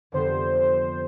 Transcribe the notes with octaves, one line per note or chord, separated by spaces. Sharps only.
F2 D3 G3 B3 C5